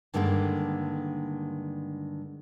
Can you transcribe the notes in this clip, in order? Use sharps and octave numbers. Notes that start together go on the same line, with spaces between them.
G2 D3 D#3 G#3 A#3 A4